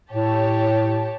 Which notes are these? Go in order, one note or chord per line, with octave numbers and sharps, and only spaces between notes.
A2 G4 C#5 A5